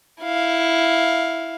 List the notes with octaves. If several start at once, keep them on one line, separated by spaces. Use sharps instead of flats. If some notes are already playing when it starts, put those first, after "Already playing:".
E4 F5